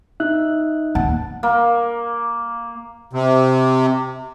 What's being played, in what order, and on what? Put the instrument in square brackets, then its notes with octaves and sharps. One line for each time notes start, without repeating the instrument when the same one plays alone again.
[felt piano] D#4 [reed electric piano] E5 F#6
[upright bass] D#2 [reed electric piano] F#5 A5
[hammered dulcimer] A#3
[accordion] C3